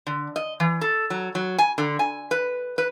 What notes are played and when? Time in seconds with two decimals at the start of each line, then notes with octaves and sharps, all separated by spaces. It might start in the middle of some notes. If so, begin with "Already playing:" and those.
0.07 D3
0.36 D#5
0.60 E3
0.81 A4
1.10 F#3
1.35 F#3
1.58 G#5
1.78 D3
1.99 G#5
2.31 B4
2.78 B4